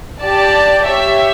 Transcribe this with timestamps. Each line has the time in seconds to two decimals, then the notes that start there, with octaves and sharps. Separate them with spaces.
0.21 G4 D5 A5
0.86 G4 C#5 E5